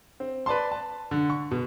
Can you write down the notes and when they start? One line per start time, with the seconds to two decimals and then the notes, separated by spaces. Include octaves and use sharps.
0.20 C4
0.46 B4 D5 A5 C6
0.72 A5
1.11 D3
1.30 C#6
1.51 B2